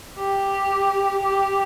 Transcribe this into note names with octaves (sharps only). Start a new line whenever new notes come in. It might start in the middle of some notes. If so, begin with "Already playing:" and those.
G4
G4